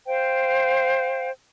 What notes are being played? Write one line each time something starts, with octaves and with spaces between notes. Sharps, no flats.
C5 F5 G5